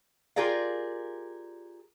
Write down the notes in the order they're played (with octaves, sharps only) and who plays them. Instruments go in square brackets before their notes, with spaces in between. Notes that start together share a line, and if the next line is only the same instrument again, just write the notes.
[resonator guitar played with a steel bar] F4 G4 G#4 A#4 D5 F5